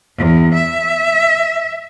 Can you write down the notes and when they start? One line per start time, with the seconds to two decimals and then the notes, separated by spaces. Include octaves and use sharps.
0.18 E2
0.54 E5